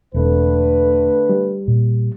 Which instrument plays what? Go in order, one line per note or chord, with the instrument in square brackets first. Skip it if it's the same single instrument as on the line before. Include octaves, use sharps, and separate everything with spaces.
[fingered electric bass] E1 C4 [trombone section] D3 A3 B4
[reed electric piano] G3
[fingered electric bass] A#2